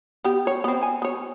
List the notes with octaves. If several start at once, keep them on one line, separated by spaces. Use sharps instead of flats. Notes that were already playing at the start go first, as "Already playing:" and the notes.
B3 G4
C#5
B3 C4
G#5
B3 C#5